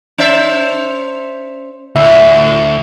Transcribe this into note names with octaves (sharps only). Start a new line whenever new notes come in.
C#4 C5 E5
D2 A2 E5